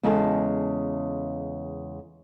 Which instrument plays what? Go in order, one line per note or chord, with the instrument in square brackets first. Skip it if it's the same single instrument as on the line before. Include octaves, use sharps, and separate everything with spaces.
[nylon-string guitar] E2 C#3 G#3 A4 G#5 A5